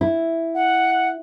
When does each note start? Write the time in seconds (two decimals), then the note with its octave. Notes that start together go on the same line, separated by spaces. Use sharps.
0.01 E4
0.55 F#5